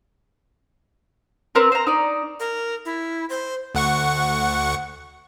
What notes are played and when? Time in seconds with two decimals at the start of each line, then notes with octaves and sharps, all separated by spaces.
1.55 C4 A#4 B4
1.72 C5 A#5
1.87 D#4 D5
2.40 A#4
2.85 E4
3.29 C5
3.75 D2 F#5 C#6